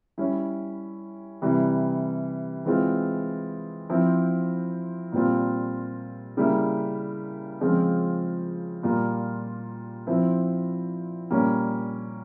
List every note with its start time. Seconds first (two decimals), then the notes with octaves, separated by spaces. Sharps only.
0.18 G3 C#4 E4
1.42 C3 E3 G3
2.65 E3 G#3 C4 F4
3.90 F3 C4 E4
5.12 A#2 G3 C4 F4
6.37 C#3 G3 A#3 E4
7.61 C#3 F3 G#3 C4 F4
8.83 A#2 G3 A#3 F4
10.07 F3 C4 E4
11.30 A#2 G3 A#3 C#4